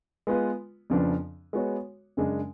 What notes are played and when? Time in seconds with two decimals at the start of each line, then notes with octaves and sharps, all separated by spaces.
0.27 G#3 B3 F4 B4
0.90 F2 C#3 F3 B3 D4
1.53 G#3 B3 F#4 C#5
2.17 F#2 C#3 G#3 D4